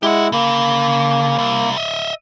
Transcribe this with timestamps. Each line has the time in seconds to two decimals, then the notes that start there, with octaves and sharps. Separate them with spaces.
0.03 G#3 E4 G4 F#5
0.32 C#3 A#3
1.39 C2
1.77 D#5 E5